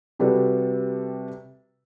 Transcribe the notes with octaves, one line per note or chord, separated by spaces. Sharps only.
C3 G3 F#4 A4 B4